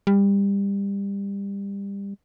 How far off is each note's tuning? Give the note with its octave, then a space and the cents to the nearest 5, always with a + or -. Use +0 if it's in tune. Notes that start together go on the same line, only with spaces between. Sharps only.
G3 +25